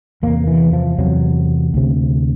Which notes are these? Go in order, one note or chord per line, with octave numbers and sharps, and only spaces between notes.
E2 C3 A#3
E3
F3
E2 C3 F#3
D2 C3